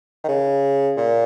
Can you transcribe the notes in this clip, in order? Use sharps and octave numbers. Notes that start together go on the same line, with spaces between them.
D#3
C#3
A#2